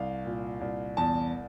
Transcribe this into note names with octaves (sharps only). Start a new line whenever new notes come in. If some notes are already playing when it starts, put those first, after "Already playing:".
Already playing: C2 F5
A#2
C2
E2 A5